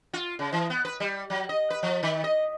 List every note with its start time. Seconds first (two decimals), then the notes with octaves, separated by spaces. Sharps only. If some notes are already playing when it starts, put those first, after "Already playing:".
0.14 F4
0.39 C#3
0.52 E3
0.70 B3
0.85 B4
1.00 G3
1.30 F#3
1.49 D#5
1.70 B4
1.83 F3
2.03 D#3
2.24 D#5